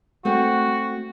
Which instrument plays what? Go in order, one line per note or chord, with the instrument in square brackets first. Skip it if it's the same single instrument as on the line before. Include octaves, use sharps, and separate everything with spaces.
[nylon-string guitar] A3 C4 [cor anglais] F#4